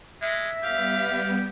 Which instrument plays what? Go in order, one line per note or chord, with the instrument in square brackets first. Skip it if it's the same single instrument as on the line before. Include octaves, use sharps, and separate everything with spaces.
[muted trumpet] G#3 [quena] E5
[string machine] G3 B3 [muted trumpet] G4 [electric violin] F5